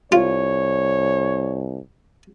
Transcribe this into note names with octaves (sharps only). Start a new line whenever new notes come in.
C2 F4 C#5